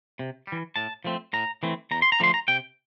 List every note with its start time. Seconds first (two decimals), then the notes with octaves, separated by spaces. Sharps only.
0.19 C3
0.47 E3 G3
0.76 A2 A5
1.05 F3 A3 C4
1.33 A2 A#5
1.63 E3 A3 C4
1.91 E2 A#5
2.02 C6
2.12 A#5
2.20 D3 F3 A3 C6
2.34 A#5
2.48 C3 G5